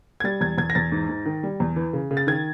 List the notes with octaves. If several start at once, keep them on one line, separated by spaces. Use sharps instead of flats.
G#6
G3 A6
E2 G#6
E2 G#6
A#6
E2 A6
G#2
G#2
D#3
G3
E2
E3
C#3
C#3
A6
D#3 G#6